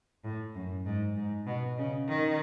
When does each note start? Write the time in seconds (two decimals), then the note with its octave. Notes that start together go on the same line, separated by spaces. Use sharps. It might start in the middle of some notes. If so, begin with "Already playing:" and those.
0.24 A2
0.54 F#2
0.85 G#2
1.16 G#2
1.47 B2
1.78 C#3
2.08 D#3